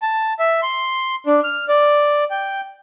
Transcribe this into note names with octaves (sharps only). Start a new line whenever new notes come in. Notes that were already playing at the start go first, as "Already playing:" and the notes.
A5
E5
C6
D4
F6
D5
G5